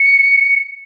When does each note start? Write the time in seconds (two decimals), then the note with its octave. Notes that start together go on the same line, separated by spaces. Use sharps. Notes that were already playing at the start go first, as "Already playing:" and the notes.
Already playing: C#7